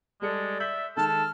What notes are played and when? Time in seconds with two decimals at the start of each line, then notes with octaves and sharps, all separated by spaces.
0.22 G3 G#3 A4 D5 C#7
0.60 E5 G6 B6 F#7
0.97 D#3 G#3 A4 A5 F6
1.08 A5